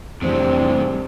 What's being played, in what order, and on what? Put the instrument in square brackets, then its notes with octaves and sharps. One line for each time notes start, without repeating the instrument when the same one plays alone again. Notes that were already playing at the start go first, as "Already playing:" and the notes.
[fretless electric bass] F2 E3 [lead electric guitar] A2 G#3 [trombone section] C3 G3 D4 [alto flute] C4